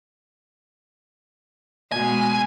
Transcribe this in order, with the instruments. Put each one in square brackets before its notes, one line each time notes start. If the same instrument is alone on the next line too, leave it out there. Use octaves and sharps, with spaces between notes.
[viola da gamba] B2 G#3 [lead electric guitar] G#5